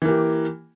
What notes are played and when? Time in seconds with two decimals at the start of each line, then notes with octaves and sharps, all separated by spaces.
0.02 E3
0.05 A#3
0.09 G4